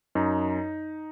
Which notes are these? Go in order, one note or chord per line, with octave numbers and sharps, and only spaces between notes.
F#2 D#4